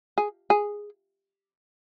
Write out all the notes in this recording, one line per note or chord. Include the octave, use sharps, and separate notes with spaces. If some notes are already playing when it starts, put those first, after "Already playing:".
G#4
G#4